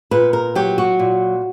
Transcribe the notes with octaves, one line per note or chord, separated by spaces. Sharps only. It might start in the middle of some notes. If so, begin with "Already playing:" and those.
A#2 B4
A#4
F#3 G4
F#4
A#2